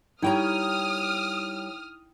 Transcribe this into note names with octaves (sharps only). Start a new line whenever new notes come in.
G3 D#4 E4 C#5 G5 A#5 D#6 F6